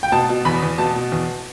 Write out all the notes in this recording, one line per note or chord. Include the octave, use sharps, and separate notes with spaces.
G5
B2 A5
B2
E2 B5
E2
B2 A5
B2
E2